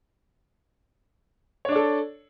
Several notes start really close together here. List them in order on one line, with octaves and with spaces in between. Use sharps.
C#5 D4 D5 A4